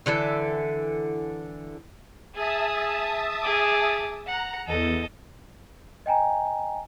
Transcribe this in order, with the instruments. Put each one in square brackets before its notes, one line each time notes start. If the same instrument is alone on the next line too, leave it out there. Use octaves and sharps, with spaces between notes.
[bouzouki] D3 E3 A4 E5
[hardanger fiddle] G#4 [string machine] E5 A5 D#6
[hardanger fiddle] G#4 D6
[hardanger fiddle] F#5 [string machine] A#5
[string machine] E2 [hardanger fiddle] A4 D#5
[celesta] D#5 G5 G#5 A#5